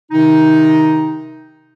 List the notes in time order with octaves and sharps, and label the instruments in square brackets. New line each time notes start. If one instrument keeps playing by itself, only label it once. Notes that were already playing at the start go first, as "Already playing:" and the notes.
[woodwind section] C3 D#3 D#4